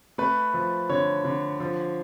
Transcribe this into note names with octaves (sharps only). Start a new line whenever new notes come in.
A3 B4
F3
D3 C#5
D3
F3